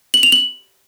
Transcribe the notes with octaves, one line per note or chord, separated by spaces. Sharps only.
F#7
F7
F#7